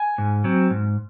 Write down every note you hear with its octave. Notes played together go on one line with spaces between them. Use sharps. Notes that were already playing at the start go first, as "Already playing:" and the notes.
Already playing: G#5
G#2
F#3 C4
G#2